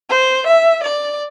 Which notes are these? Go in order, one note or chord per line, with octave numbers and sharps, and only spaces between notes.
C5
E5
D5